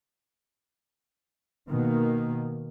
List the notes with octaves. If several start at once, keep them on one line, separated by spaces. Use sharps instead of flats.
B2 D#3 A#3